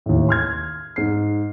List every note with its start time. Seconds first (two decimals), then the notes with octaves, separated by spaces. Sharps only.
0.06 D#2 A2
0.29 C6 F6 G#6
0.96 G#2 C7